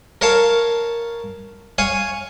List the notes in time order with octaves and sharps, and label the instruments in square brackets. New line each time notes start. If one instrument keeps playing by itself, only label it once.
[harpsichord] A#4 C#5 F5 A5
C#5 F5 G#5